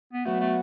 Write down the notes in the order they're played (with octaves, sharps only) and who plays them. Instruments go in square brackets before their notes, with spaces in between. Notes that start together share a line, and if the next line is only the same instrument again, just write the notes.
[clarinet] B3
[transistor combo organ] F#3 B3 F#4 [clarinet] A3
[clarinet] A3